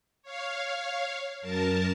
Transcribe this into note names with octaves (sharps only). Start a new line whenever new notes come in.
C#5 F5
F#2 A#4 A5